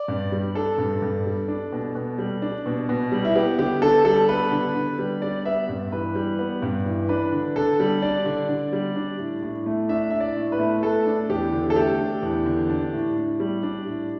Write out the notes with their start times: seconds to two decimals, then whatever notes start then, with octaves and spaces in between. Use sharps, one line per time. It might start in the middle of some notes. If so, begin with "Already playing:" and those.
Already playing: D5
0.08 G2
0.32 G3
0.55 D4 A4
0.78 G2
1.02 G2
1.26 G3
1.48 D4
1.72 B2
1.95 B2
2.18 G3
2.42 D4
2.66 B2
2.89 B2
3.12 G3
3.25 E4
3.35 B3 G4
3.59 D3 G4
3.82 D3 A4
4.05 G3 A4
4.29 B3 B4
4.52 D3
4.76 D3
4.99 G3
5.22 G3 D5
5.45 B3 E5
5.69 G2
5.92 E3 B4
6.15 G3
6.39 B3
6.62 G2
6.86 E3
7.09 D4 B4
7.32 D3
7.56 D3 A4
7.80 G3
8.02 D4 D5
8.26 D3
8.49 D3
8.73 G3
8.96 D4
9.19 A2
9.43 A2
9.66 A3
9.89 D4 E5
10.10 A2 E5
10.20 D5
10.37 A2
10.52 B4
10.59 A3
10.83 A3 A4
11.06 D4
11.29 E2 G4
11.53 D3
11.70 A4
11.76 A3 G4
11.99 D4
12.22 E2
12.46 D3
12.69 D4
12.93 A2
13.16 A2
13.40 G3
13.63 D4
13.87 A2